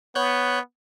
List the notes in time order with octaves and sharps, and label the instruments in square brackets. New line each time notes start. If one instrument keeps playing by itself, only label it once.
[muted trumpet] B3 [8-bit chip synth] C#5 F#6 G6